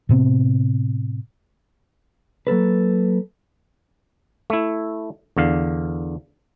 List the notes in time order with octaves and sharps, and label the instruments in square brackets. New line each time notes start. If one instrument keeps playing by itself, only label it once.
[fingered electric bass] A2 C3 B3 C4
[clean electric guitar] F#3 A#3 A4 B4
[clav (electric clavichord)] A3 E4
E2 D3 F5